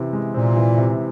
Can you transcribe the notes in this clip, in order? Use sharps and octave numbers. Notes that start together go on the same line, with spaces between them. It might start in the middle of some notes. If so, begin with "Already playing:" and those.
Already playing: C3 E3 C4
G#3
A#2 C4
E3
C3